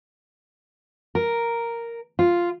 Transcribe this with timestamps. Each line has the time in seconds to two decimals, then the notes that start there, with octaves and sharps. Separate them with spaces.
1.15 A#4
2.19 F4